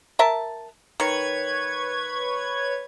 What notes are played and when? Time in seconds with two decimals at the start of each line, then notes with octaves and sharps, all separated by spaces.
0.19 A#4 E5 A5
1.00 D#3 B4 C#5 G#6